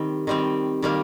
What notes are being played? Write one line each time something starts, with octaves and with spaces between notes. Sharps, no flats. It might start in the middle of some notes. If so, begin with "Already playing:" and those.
Already playing: D#3 G3 C4
D#3 G3 C4
D#3 G3 A#3